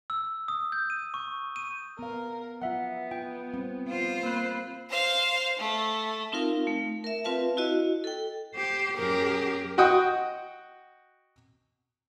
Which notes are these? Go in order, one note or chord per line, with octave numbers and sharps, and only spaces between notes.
E6
D#6
G6
D#7
C#6
D#7
B3 A#4 F5
F#3 B3 F4 E5 F#5
F4 G5
G3 C4
F4 C5
A#3 B5 F#6
C5 F5
A3
C4 D#4 F4 A#4 F5
A3
A#4 E5
C4 F4 B4 F5 A5
E4 F#4 D#5
A4 G5
G4 C5
F#2 G4 G#4 A#4
F#4 D#5 F#5 G5 D#6